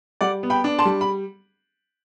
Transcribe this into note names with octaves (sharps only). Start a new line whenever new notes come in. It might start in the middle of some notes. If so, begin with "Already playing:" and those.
G3 D5 F#5
B3
G5 B5
D4
A5 C6
G3
B5